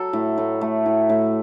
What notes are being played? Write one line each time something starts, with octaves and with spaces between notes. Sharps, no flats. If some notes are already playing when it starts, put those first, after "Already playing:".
Already playing: F#3 A4
A2
A2
A3
A2
A2